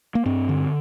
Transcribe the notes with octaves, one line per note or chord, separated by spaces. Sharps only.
A#3
G2 C4
D3